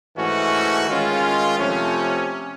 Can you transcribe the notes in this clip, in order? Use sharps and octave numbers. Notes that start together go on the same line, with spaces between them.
G#2 E3 A3 C#4 F#4
D#3 G#3 C#4 F4
C3 F3 A3 C#4